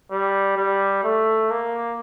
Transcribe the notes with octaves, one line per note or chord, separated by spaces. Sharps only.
G3
G3
A3
A#3